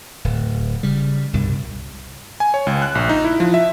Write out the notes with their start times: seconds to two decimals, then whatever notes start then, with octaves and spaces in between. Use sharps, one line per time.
0.24 D1
0.83 C#3 G3
1.33 C2 G2 B2
2.40 G#5
2.54 C#5
2.67 C#2
2.82 F#6
2.95 A#1
3.09 D#4
3.24 E4
3.40 F3
3.54 E5